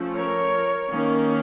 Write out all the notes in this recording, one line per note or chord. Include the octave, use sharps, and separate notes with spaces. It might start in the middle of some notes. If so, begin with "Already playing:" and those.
Already playing: F3 A3 C#4
A#4 C#5
D#3 A#3 C#4